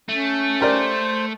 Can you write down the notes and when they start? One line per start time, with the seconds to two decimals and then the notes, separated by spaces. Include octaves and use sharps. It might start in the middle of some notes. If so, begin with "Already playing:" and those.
0.09 A3 C#4
0.60 G4 A#4 C5 D5